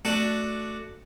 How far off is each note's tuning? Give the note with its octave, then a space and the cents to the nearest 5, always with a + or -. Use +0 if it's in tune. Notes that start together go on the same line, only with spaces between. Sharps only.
A3 +0 D4 +0 F#4 +0